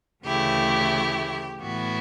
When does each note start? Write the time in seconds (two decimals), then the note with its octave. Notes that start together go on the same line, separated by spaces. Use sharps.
0.25 D2 C#3 E3 A3 E4 G4
1.61 A2 E3 B3 E4 F#4